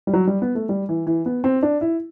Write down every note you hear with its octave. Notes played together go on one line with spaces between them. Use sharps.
G3
F#3
G3
B3
A3
G3
E3
E3
B3
C4
D4
E4